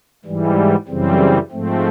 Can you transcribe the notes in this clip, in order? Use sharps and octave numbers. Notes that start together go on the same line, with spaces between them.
G#2 E3 G3
F#2 C#3 E3 G3 C4
G#2 F3 A3 C4